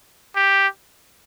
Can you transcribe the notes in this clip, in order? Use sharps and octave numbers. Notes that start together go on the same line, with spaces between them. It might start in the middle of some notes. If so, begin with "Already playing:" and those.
G4